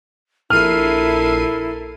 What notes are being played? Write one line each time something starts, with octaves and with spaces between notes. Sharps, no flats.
A#1 E4 A4 A#4 F6 C7 D#7